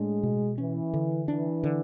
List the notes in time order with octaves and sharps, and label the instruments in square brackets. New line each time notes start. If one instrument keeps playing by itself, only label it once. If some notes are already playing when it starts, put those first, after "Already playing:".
Already playing: [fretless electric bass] A2 D4 [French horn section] G#3
[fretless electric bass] B2
[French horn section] E3 [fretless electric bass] C#4
[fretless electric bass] D3
[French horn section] E3 [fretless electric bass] D4
[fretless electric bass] D3